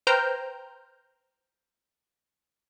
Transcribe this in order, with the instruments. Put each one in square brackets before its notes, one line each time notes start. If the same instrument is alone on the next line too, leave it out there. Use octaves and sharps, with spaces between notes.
[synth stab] B4 C5 G5 A#5 F6 G6